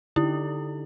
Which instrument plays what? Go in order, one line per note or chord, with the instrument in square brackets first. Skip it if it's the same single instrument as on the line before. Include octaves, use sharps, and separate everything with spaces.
[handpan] D3 D#4 G4 [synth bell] E4